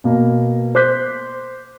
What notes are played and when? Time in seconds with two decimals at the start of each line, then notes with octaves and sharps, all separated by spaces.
0.04 B2 A#3
0.75 C5 D6 F#6 G6 B6